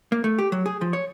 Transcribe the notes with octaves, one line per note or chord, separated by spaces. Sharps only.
A#3
A3
G4
F#3
G#4
F3
C#5